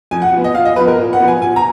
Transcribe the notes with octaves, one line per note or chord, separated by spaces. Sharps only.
F2 G#5
F#5
F3 B3
D#5
A#2 F5
D#5
F3 B3 B4
A#4
A#2
F#5
F3 B3
G#5
A#2 G#5
A#5